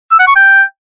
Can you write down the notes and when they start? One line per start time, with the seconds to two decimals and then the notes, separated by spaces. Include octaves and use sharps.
0.11 E6
0.19 F#5
0.28 C#6
0.36 G5